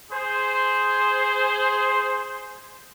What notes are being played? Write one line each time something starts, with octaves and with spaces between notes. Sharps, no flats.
G#4 C5